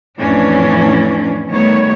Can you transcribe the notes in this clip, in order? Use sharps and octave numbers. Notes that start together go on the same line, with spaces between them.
F2 A2 E3 C#4 D4
D#3 G3 A3 B3 C#5